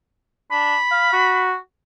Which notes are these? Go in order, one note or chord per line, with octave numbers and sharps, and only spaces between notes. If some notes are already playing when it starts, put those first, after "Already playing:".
D4 B5
F5
F#4